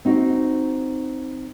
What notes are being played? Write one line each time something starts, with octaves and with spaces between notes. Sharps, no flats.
C4 D#4 F#4